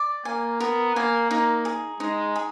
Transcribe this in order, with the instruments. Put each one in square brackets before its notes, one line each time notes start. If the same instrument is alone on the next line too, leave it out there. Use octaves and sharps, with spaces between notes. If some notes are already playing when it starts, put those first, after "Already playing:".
Already playing: [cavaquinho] D5
[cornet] A#3 [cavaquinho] G#5
[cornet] B3 [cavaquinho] A#4
[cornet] A#3 [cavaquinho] G#5
[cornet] A#3 [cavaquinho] D#4
[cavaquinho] G#4
[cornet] G#3 [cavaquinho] D#4
[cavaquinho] G#4